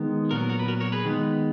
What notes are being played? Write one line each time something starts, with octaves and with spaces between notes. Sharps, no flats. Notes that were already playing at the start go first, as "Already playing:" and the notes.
Already playing: D#3 G#3 B3
A#2 F#3 B3 F#4 A#4
F#4 A#4
B4
F#4 A#4
A#4 C#5
G#4 B4
D#3 G#3 B3